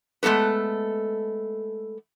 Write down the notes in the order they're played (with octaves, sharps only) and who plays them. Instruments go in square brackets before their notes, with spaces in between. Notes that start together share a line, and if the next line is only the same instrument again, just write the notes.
[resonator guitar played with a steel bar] G#3 A3 B3 A4 B4